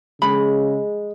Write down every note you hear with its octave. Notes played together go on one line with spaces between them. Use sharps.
C#3 G#3 B5